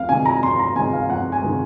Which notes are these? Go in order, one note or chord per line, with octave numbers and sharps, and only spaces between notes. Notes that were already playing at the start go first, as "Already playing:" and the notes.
Already playing: F2 F5
C3 D#3 G#3 G#5
A#5
F2 C6
A#5
C3 D#3 G#3 G#5
F5
F2 F#5
G#5
C3 D#3 G#3